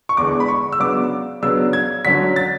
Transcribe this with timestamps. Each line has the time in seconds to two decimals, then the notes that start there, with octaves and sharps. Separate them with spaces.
0.09 C#6
0.17 E2 D3 G#3 D6
0.40 B5
0.48 C#6
0.72 E6
0.80 C#3 F#3 B3 D4 D6
1.42 C#3 F#3 B3 D4 E6
1.73 G#6
2.05 D3 F#3 C#4 B6
2.36 A6